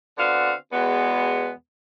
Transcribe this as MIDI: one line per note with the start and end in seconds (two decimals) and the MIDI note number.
0.18 0.52 50
0.18 0.52 59
0.18 0.52 60
0.18 0.52 62
0.18 0.52 66
0.18 0.52 77
0.72 1.49 40
0.72 1.49 47
0.72 1.49 56
0.72 1.49 59